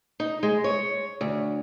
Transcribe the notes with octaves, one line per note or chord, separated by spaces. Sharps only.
D#4
G#3
C#5
D2